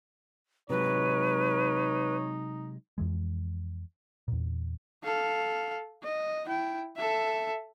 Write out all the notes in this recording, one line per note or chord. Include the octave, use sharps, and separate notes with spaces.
C3 F#3 G#3 D#4 B4 C#5
F2 E3 G#3
E2 A#2
A4 F5
D#5
E4 G5
A4 E5